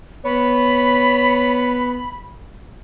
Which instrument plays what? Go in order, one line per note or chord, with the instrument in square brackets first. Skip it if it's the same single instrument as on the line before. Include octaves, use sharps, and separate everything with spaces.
[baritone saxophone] B3 [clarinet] C#5 [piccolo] B5